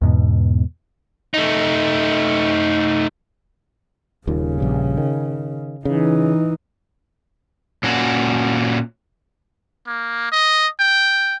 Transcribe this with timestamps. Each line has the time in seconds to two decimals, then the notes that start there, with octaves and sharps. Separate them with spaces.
0.01 E2 G#2 B2
1.34 A3 D#4
4.27 D#1 D#2 A#2 C#3
4.60 A#1 G2
4.97 D#3
5.85 C#3 E3 D#4
7.83 A#2 C#4 F#4
9.87 A#3
10.32 D#5
10.80 G5